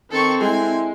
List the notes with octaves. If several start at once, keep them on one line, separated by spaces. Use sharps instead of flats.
D#3 C4 A4 C#6
G#3 E4 G#5